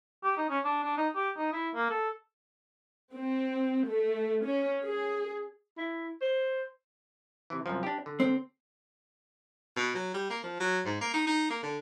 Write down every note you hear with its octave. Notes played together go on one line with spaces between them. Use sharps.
G4
D#4
C#4
D4
D4
D#4
G4
D#4
E4
A#3
A4
C4
A3
C#4
G#4
E4
C5
C3 E3
C2 F#2 F3
D4 G4
D3
C4
B2
F#3
G3
A#3
F3
F#3
G#2
A#3
D#4
D#4
A#3
D3